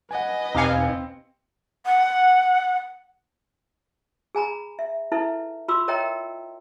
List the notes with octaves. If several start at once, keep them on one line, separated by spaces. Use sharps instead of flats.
B4 D#5 F#5 G#5
E2 B2 C4 D#4 G4 F5 G#5 C#7
F#5
G#4 G#5 A#5 B5
E5
D#4 E4 A4 B4 E5
F4 B5 C6 D6 E6
A#4 C#5 D#5 E5 G5 A#5